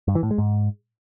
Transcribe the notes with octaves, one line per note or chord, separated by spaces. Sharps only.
G2
E3
A2
G#3
G#2